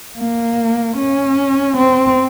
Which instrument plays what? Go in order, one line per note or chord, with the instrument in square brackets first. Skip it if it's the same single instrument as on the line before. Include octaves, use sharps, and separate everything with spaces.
[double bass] A#3
C#4
C4